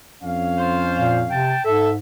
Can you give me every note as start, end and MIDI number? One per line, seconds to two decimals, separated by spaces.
0.23 1.46 41
0.23 1.46 61
0.23 1.46 77
0.58 1.18 65
0.58 1.18 72
0.99 1.24 46
1.30 1.55 48
1.30 1.63 79
1.30 1.63 81
1.65 1.97 44
1.65 1.91 69
1.65 1.90 76